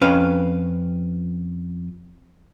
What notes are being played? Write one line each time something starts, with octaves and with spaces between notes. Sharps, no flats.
F2 C#4 B4 F5